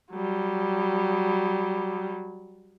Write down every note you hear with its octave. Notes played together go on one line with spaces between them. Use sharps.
F#3 G3